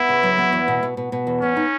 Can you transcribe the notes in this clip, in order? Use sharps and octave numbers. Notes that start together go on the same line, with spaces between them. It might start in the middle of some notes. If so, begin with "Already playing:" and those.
Already playing: B3 E4
C#3
F#3
B3
E2
B2
B2
B2
B2
E2
B3 C#4
D#4